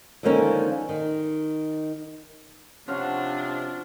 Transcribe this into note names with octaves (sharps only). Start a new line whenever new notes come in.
D3 D#3 F3 G#3 A#3 C#4
D#3
C3 F3 C#4 D4 F#4 C#5 F5